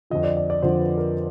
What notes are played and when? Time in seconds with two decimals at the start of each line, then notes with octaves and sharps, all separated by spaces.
0.10 F2 D3 F3 D#5
0.24 D5
0.37 D5
0.50 D5
0.62 F2 D3 F3 C5
0.79 B4
0.98 A#4